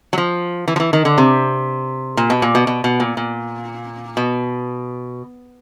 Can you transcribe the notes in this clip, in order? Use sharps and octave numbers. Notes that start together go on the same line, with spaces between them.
F#3
F3
E3
F3
E3
D#3
D3
C3
A#2
B2
A#2
B2
B2
B2
A#2
A#2
B2